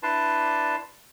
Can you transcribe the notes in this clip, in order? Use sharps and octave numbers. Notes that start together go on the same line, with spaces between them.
D4 E4 B4 D5 A5 C6